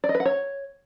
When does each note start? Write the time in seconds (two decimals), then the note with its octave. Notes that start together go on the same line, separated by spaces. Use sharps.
0.04 D5
0.09 D#5
0.15 B4
0.20 F#5
0.25 C#5